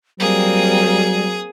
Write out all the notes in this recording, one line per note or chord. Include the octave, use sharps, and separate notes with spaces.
F#3 G3 A#3 C4 G#4 D#6